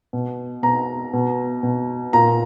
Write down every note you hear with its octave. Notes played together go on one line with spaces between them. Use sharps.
B2
B2 A#5
B2
B2
A#2 A#5